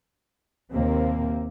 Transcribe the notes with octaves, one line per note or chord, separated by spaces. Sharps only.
D#2 C3 A#3 C4